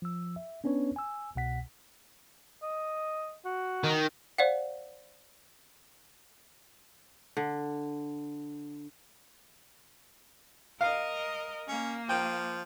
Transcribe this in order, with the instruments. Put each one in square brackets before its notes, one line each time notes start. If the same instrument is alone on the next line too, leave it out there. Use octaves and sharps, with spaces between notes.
[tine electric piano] F3 E6
E5
B3 C#4 D4 B4 C#5
G#5 E6
C2 B2 F#5 B6
[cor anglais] D#5
F#4
[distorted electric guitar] D#3
[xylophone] C5 D5 F5 F#5
[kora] D3
[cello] A#4 D#5 [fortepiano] F5
[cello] A#3 [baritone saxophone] C#4
[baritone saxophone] F3 [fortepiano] G5